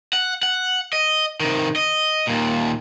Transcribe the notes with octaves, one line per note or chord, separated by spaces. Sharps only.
F#5
F#5
D#5
C3 D#3
D#5
D#2 A#2